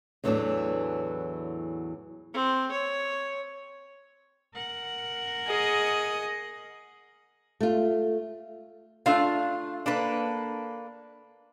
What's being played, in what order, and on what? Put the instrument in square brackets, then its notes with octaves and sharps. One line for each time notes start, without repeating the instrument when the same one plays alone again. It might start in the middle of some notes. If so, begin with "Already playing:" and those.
[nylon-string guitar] E2 A2 E3 F#3 A3 D4
[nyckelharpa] C4
C#5
[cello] A#4 F#5
[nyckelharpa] G#4 D#5
[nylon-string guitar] A3 F4
[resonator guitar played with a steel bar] A3 D4 F4 [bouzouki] F5
[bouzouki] A#3 A4 B4 [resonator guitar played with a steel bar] D4